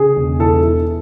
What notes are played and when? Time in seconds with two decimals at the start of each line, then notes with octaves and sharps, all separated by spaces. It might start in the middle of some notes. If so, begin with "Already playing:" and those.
Already playing: C#3 G#4
0.16 E1
0.39 E3 A4
0.63 E3